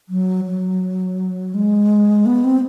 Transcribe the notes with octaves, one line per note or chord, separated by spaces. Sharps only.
F#3
F#3
G#3
B3
C4